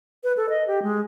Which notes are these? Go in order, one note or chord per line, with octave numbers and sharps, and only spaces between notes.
B4
A4
D#5
G4
G#3